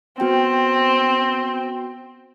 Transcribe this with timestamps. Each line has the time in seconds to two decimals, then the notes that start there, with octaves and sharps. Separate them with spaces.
0.20 B3 C4 F#4 G5